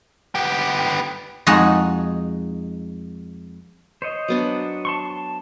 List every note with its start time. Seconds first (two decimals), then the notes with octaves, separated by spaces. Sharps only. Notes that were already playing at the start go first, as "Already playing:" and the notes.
0.35 B3 G4
1.47 F2 G#3 D#4 F#4 G#4 F#5
4.02 C5 C#5 D#5
4.28 F#3 B3 D4
4.85 A5 C6 C#6
5.11 A5